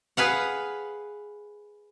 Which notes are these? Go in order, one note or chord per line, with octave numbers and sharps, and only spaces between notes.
G#4 B4 F5 F#5